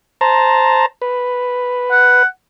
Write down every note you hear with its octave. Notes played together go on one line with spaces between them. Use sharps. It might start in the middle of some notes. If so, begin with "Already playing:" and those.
C5 A5 A#5
B4
F#5